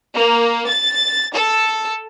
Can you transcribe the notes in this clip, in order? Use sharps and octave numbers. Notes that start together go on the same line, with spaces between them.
A#3
A6
A4